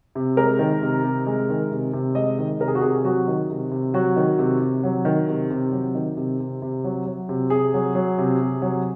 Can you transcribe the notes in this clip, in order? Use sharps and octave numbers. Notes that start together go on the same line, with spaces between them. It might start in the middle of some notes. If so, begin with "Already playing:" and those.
C3
G#3 A#4
D#3
C3
C3
G#3
D#3
C3
C3
G#3 D#5
D#3
C3 A#4
G#4
F#4
C3 G#4
F#3 F#4
D#3
C3
C3
F#3 F#4
D#3
C3
C3
F#3
D#3
C3
C3
F#3
D#3
C3
C3
C3
F#3
F#3
C3
C3 G#4
F#3
F#3
C3
C3
F#3